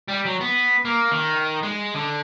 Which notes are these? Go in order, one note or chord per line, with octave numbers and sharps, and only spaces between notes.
G3
F#3
B3
A#3
D#3
G#3
D3